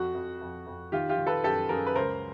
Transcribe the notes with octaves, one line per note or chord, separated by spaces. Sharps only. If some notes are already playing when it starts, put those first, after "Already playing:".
Already playing: F2 F#4
F2
F2
F2
D#3 F4 G4
F4 G4
D#3
A4 B4
F#2 G4 A4
F#2 G#4 A#4
B4
C#2 A#4 C5